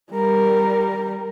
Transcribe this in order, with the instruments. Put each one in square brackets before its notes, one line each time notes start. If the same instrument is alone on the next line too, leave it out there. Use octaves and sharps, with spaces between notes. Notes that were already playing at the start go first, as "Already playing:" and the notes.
[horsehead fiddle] G3 A#4